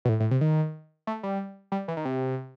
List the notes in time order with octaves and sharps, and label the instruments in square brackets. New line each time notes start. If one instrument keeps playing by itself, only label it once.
[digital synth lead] B2
A2
A2
C3
D#3
A3
G3
G3
E3
D#3
C3